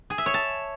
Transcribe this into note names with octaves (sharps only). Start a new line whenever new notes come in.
G#4
E5
C#5
A5